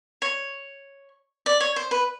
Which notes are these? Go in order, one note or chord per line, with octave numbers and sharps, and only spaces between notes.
C#5
D5
C#5
C5
B4